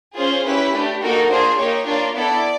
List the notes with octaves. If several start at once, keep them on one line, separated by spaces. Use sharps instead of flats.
C#4 F4 G#4 C5
C#4 E4 G4 B4
A3 D4 G4
A#3 D#4 F#4 A4 A#4
A#3 D4 F4 G#4 C5
A#3 D#4 G4 C#5
A#3 D4 F4 C#5
B3 E4 A4 D5